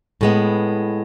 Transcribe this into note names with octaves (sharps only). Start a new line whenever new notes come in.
A2 G#3 B3